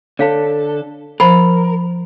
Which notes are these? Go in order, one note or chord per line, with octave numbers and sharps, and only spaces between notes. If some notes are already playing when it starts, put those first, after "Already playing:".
D3 A4 C#5 F5
F3 A#4 C5 B5